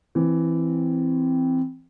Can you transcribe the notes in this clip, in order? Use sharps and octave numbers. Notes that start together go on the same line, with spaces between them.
E3 C4